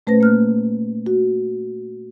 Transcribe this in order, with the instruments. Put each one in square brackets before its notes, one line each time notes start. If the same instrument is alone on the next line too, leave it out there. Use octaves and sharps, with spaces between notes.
[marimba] A#2 A3 C#4 B4 C5 A#6
A#3 F6 F#6
F#4